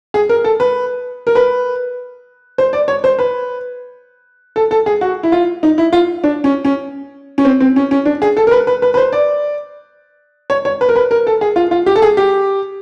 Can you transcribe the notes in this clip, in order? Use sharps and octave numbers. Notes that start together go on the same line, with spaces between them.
G#4
A#4
A4
B4
A#4
B4
C5
D5
C#5
C5
B4
A4
A4
G#4
F#4
E4
F4
D#4
E4
F4
D4
C#4
C#4
C#4
C4
C4
C#4
C#4
D4
G#4
A4
A#4
B4
B4
B4
B4
C5
D5
C#5
C#5
B4
A#4
B4
A#4
A4
G#4
F4
F4
G4
A4
G#4
G4